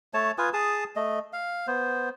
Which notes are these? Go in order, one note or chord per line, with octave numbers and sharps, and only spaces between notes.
A3 C#5 A5
F4 B4 G#5 D#6
G#4 A5 D#6
A3 D#5
F5
B3 C5